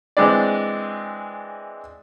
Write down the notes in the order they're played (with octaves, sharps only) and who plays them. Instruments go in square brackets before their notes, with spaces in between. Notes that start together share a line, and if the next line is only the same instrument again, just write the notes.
[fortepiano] E3 G#3 C4 D4 D5